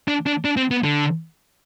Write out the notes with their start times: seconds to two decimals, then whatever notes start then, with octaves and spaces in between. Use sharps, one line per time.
0.08 D4
0.27 D4
0.45 D4
0.57 C4
0.71 B3
0.84 D3